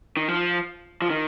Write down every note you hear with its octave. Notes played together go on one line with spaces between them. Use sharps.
D#3
F3
F3
D#3